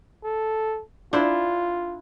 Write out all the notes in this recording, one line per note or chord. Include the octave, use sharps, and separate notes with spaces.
A4
D4 E4 F4 C5